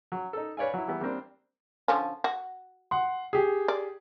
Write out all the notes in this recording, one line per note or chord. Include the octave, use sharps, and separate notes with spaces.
F#3
D#4 A4
B4 C#5 D5 F5 G#5
F#3 E4
E3 G3 B3 E4
G3 A#3 C4 D4
D3 F3 C#4
F#4
F#5 C6
G4 G#4
D5